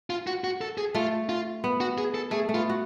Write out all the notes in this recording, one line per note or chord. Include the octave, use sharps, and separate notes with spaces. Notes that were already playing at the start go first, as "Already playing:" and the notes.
F4
F#4
F#4
A4
G#4
A3 F4
F4
B3
F#4
G#4
A4
A3 G#4
A3
B3 F4
F#4